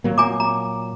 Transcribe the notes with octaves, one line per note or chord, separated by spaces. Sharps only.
A#2 F#3 A#3
G#5 A#5 D6
A#5